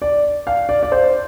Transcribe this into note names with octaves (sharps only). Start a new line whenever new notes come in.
D5
F5
D5
D5
C5